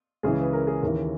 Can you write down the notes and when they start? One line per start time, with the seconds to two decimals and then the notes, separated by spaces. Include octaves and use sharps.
0.23 C#2 C#3 E3 G#4
0.42 B4
0.53 A#4
0.67 G#4
0.83 D#2 C#3 E3 A#4